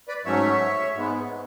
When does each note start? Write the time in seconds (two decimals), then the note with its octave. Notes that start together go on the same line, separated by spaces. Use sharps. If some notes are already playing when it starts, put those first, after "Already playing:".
0.08 B4 D5
0.25 G#2 F#3 A3 C#4 C#5 E5
0.95 G#2 G#3 B3